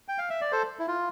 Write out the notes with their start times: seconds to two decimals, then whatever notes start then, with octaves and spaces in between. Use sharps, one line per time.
0.08 G5
0.18 F5
0.30 E5
0.41 D5
0.52 A4 C5
0.79 E4
0.88 F4